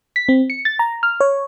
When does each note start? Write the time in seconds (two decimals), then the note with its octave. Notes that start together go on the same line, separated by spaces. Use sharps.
0.16 B6
0.29 C4
0.50 C#7
0.65 A6
0.79 A#5
1.03 F6
1.20 C#5